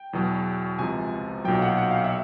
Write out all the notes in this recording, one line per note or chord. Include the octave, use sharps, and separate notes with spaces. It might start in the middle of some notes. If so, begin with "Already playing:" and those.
Already playing: G5
E2 B2 F#3
C#2 C3 F3 G#5
B1 A#2 F#3 G5
F#5
F#5
F5
E5